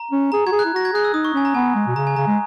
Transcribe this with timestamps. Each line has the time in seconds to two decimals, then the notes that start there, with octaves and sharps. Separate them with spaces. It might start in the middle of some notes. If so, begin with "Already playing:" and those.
Already playing: A#5
0.11 C#4
0.32 G#4 A#5
0.46 F#4 G#6
0.52 G#4
0.59 F#6
0.65 E4
0.74 F#4 A#6
0.85 G#6
0.93 G#4 F#6
1.04 E6
1.14 D#4 D#6
1.25 C#6
1.34 C#4 G#5
1.45 A#5
1.54 B3 G#5
1.75 G#3
1.88 B2
1.96 C#3 A#5
2.07 G#5
2.16 C#3 A#5
2.27 G#3